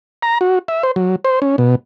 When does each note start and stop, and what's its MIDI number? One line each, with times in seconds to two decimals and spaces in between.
0.23 0.38 82
0.41 0.59 66
0.68 0.83 76
0.83 0.91 72
0.96 1.16 54
1.25 1.39 72
1.42 1.56 61
1.58 1.75 47